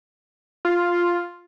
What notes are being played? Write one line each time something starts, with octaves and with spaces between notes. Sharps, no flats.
F4